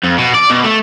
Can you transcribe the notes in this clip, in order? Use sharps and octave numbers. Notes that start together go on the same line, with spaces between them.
F2
B2
D5
B2
A3